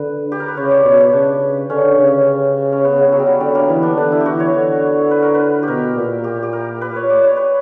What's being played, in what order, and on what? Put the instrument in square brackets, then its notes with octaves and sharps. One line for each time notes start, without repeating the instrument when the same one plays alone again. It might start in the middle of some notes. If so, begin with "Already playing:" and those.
Already playing: [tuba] D3 [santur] B4
[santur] G4
A#4
B4
[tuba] C#3 [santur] C#5
[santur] D5
[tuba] B2 [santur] C#5
[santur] C#5
[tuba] C#3 [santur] D4
[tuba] D3 [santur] C#4
[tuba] C#3
[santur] C#4
B3
F#3
G3
F#3
[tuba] D3 [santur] G3
[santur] A#3
[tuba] E3 [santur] B3
[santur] D4
[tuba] D3 [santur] D4
[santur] E4
G4
[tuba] E3 [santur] F#4
[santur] C#5
[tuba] D3 [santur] C#5
[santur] B4
A#4
B4
G4
[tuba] B2 [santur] A#4
[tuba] A#2
[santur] G4
G4
A#4
B4
C#5
D5
C#5
B4